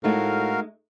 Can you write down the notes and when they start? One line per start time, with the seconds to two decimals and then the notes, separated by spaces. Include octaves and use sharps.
0.04 A2 G#3 A3 D#4 F#4 A#4 F5